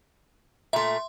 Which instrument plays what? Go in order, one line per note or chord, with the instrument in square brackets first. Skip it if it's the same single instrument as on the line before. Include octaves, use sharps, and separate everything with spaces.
[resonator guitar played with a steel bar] A#2 A3 [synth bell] E5 C6